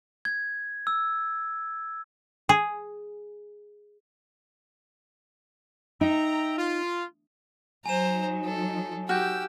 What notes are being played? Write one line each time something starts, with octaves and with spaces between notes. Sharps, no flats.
G#6
E6
G#4
D#4 E5 G5 A#5
F4
F#3 D#4 C5 G#5 A#5 E7
A4
F#4 G4 E6 F6 G6